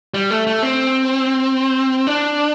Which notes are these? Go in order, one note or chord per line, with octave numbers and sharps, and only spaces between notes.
G3
A3
A3
C4
D4